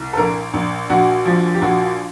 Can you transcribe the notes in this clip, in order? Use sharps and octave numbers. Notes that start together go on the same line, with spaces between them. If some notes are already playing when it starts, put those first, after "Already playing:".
Already playing: C2
A4
A#1 A#4
A#1
A#1 F#4
F3
G4
A#1 F#4